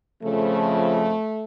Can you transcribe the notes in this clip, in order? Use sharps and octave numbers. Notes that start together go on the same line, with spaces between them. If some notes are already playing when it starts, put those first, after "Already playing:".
F2 C#3 F3 A3